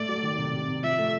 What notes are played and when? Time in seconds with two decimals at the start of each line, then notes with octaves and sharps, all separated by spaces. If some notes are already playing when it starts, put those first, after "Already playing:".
Already playing: A3 D5
0.09 F#3
0.23 D#3
0.38 C3
0.53 C3
0.68 C3
0.83 F3 E5
0.99 A3